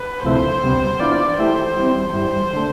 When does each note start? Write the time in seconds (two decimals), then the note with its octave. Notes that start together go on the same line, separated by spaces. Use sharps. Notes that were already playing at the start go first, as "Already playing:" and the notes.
Already playing: B4
0.23 D2 C3 F3 A3 E4 C5
0.62 D2 C3 G3 B3
0.99 E3 B3 D4 F4 D5
1.38 E3 A3 E4 G4 C5
1.76 E3 G3 C4
2.13 G2 E3 G3 C5
2.53 D3 A3